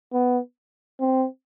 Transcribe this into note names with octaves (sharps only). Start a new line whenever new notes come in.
B3
C4